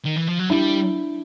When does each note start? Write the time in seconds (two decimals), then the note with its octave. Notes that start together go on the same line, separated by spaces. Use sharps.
0.05 D#3
0.16 E3
0.27 F3
0.39 F#3
0.49 G3 D4 E4